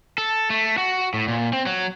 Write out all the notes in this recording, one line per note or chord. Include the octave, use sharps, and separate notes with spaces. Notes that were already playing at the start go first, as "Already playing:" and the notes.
A4
A3
F#4
A2
A#2
C4
F#3